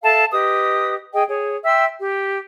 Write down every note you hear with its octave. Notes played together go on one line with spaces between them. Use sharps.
A4 E5 F5 A5
G4 B4 D#5 D#6
G#4 D#5 G5
G#4 C#5
E5 G5 C6 E6
G4